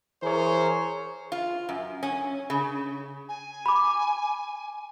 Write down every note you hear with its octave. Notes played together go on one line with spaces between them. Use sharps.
E3 G#4 A#4 C5 C#5
F4
F#2
C#4
C#3
G#5
B5 D6